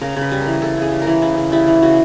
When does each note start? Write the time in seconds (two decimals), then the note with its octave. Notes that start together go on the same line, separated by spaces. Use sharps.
0.01 C#3 A#4
0.16 C#3 B4
0.32 G3
0.41 A#4
0.47 E3
0.62 C#3 A4
0.77 C#3 G#4
0.92 G3
1.02 E3 A#4
1.22 C#3 E4
1.37 C#3
1.52 G3 E4
1.67 E3
1.82 C#3 F#4